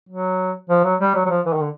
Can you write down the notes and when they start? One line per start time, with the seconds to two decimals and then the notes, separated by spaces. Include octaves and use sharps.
0.09 F#3
0.70 F3
0.85 F#3
1.01 G3
1.15 F#3
1.26 F#3
1.30 F3
1.46 E3
1.53 D#3
1.61 D3